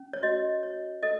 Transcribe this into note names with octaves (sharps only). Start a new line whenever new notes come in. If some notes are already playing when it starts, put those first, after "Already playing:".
Already playing: C#4
C#5
F#4 D#5
C#5
A4 D#5